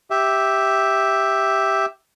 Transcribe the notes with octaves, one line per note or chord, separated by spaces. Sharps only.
G4 E5